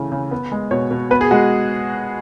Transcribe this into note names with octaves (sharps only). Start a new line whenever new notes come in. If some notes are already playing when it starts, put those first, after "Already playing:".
Already playing: C#3 E3 A3 G#5
C#3
B3
G#3
B2 C#5
B2
B3 B4
G#4
G#3 F#4